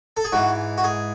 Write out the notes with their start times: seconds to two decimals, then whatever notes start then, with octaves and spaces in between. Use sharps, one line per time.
0.17 A4
0.25 G#4
0.32 G#2 E3 F#4
0.78 F#4
0.84 G#4